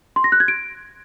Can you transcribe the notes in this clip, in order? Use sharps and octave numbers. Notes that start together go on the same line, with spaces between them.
C6
A#6
F#6
G#6
D7